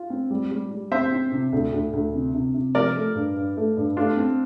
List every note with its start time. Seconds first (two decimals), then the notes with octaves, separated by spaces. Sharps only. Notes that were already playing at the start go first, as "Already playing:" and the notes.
Already playing: F4
0.10 C4
0.30 G3
0.51 G3
0.71 G3
0.91 C4 C5 E5
1.12 C4
1.32 C3
1.52 D2
1.72 D2
1.93 D2
2.14 C3
2.34 C3
2.54 C3
2.75 F3 A#4 D5
2.96 A3
3.15 G2
3.36 G2
3.57 A3
3.77 G2
3.97 A3 D4 F4
4.17 C4